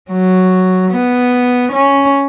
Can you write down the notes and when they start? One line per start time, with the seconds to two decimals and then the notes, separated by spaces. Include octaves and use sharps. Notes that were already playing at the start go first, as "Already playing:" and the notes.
0.11 F#3
0.92 B3
1.73 C#4